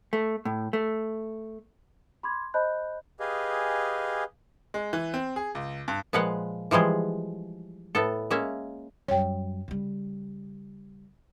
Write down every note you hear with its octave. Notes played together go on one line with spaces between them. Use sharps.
A3
A2
A3
B5 C6 D6 G#6
C5 D#5 A5 B5 F#6 G6
G4 G#4 B4 D#5 F5 G#5
G#3
E3
C4
G#4
C#2
G2
A#2 F3 G#3 B4 F5 F#5
E3 F3 G3 G#3 G#4
A2 B3 A4
G#3 A#3 C#4 E5
F#2 G3 C#5 G5
C#3 G3